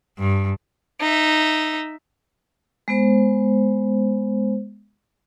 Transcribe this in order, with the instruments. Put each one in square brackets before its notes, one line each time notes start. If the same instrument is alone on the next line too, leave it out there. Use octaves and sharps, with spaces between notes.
[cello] G2
[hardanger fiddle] D#4 E5
[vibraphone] G#3 B3 C5